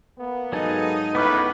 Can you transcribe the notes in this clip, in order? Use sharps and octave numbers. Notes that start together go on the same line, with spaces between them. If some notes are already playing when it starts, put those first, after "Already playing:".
A#3 B3
G#2 F#3 D#4 G#4 A4 D#5
C#2 A2 B3 B4 D6 F6